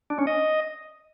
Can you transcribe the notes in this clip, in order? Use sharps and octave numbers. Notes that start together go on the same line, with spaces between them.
D4
C#4
D#5